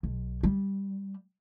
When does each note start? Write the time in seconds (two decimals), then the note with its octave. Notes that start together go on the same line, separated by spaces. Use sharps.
0.03 B1
0.43 G3